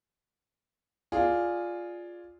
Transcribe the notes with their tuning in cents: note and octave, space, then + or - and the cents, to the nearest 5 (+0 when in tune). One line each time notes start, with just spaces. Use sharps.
F4 +0 G#4 +0 D5 +0